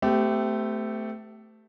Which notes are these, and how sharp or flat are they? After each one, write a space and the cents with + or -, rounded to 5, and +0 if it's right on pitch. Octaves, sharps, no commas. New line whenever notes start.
A3 +0 C4 -45 G4 -10